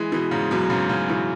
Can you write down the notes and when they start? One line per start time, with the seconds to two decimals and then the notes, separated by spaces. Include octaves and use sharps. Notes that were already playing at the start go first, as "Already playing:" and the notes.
Already playing: E3 G#3
0.12 B2 E3
0.31 G#2 C#3
0.51 F#2 B2
0.70 G#2 C#3
0.89 G#2 C#3
1.08 B2 E3